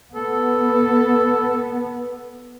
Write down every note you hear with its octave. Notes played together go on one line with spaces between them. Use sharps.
B3 A4